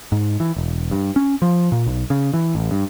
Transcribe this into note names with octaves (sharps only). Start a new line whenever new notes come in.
G#2
E3
E1
G2
C#4
F3
A#2
B1
C#3
E3
A1
G2